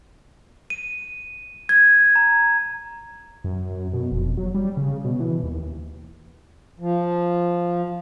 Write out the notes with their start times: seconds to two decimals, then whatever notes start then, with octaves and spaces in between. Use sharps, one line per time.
0.70 D#7
1.69 G#6
2.16 A#5
3.44 F#2
3.94 B2
4.11 F1
4.37 F#3
4.55 G3
4.77 C#3
5.05 B2
5.20 E3
5.44 D#2
6.79 F3